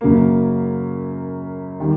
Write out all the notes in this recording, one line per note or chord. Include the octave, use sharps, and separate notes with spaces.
F#2 C#3 F#3 A#3
D#3 G3